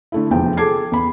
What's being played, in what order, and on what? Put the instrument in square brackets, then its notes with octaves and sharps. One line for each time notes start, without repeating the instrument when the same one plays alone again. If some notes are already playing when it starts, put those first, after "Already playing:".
[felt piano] D3 A3 E4
F1 E2 F3 G5
G#4 A4 D6 G#6 C7
E2 B5